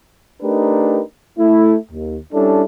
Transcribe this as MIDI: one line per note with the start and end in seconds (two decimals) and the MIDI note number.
0.42 1.00 57
0.42 1.00 62
0.42 1.00 63
0.42 1.00 67
0.42 1.00 70
0.42 1.00 71
1.38 1.75 57
1.38 1.75 64
1.91 2.17 39
2.33 2.63 55
2.33 2.63 61
2.33 2.63 62
2.33 2.63 64
2.33 2.63 69